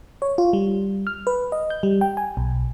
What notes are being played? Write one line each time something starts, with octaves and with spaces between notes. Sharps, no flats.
C#5
F4
G3
F6
B4
D#5
G6
G3
G5
G#5
B1